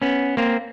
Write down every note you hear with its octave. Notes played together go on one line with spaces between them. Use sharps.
B3 C#4
A#3 C4